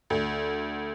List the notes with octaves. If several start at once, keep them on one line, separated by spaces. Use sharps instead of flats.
D2